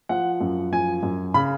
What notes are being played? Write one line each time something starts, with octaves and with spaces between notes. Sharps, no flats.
F3 F#5
F#2
F3 G#5
F#2
C#3 B5